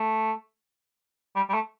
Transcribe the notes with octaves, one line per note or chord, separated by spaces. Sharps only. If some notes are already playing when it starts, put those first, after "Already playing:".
Already playing: A3
G3
G3
A3